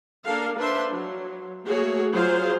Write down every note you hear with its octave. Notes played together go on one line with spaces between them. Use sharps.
A#3 D4 A4 A#4 F5
D4 B4 C5 E5 C6
F#3
A3 A#3 F#4 G#4 C#5
F#3 F4 G#4 C5 F5